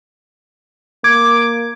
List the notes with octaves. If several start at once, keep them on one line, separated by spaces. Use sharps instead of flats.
A#3 D6 G#6